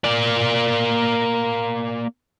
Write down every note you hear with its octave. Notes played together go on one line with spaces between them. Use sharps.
A#3 D5